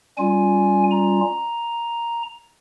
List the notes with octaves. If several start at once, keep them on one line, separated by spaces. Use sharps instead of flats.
G3 C#4 F4 G#5
A#5